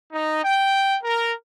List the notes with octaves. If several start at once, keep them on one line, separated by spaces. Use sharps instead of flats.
D#4
G5
A#4